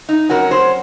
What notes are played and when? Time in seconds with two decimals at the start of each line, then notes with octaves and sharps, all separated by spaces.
0.09 D#4
0.29 F2 C3 F#3 C#4 F#4 A#4
0.51 G#4 C5